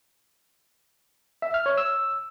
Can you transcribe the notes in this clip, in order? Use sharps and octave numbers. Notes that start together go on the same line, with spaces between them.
E5
F6
C#5
E6